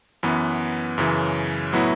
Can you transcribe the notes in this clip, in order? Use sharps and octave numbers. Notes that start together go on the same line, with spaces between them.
F#2 E3 B3
F#2 C#3 E3
A2 F#3 B3 E4